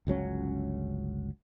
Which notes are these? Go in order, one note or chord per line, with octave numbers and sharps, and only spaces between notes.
G1 C#2 F#3 C#4